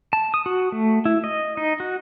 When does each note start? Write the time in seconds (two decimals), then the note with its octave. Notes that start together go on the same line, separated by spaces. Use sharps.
0.13 A5
0.34 D#6
0.46 F#4
0.72 A3
1.05 E4
1.24 D#5
1.57 D#4
1.80 F#4